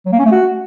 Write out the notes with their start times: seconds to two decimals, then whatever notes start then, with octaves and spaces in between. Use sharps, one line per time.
0.06 F#3
0.12 A#3
0.19 C#4
0.25 A3
0.32 F#4